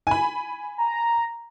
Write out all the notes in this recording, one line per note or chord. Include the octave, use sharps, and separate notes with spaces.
G#5 B5
A#5